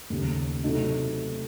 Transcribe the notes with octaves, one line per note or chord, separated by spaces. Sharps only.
D#2 C#3 A3
C3 F#3 A3 D#4 F#4